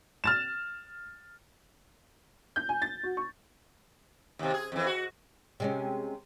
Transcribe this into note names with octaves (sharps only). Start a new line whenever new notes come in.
F6 A6 E7
G6
G#5
A6
F#4
C#6
D#2 C3
G#4
F2 E3
F#4
C3 G#3 C#4